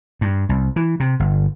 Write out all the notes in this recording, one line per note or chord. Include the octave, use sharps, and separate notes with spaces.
G2
C2
E3
C3
G1